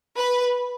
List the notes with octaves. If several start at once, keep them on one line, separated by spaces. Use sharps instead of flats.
B4